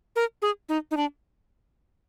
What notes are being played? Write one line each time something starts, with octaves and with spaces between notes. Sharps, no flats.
A#4
G#4
D#4
D#4
D4